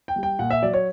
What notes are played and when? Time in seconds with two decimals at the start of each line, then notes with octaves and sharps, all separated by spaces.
0.08 G5
0.16 G3
0.23 G5
0.39 A#2 F#5
0.50 E5
0.62 F#3 D5
0.74 C#5